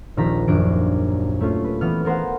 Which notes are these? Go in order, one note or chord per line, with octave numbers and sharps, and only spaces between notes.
D#1 A#1 D#3 F3 A#5 B6
D#1 F#2 D4 D7
A3 C#4 F4
B4
E3 B3 F6
B3 A#4 C5 F5 F#5